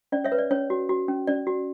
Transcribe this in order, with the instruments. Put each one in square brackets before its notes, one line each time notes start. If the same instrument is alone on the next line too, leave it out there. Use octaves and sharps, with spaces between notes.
[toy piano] C#4 D5
C#5 E5
B4
D5
C#4 C#5
F#4
F#4
C#4
C#4 D5
F#4